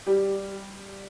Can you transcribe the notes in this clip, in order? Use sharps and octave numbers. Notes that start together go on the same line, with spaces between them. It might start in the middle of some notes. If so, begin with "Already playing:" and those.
G3 G4